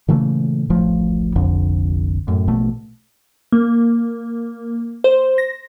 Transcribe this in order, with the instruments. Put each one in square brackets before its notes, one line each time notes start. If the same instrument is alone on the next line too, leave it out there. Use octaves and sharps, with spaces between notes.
[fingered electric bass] A#2 C#3 E3 A3
D1 A1 F3 A3
F1 A#1 F2 D3
F#2 A2
A#1 B2 A3
[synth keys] A#3
C5
A#6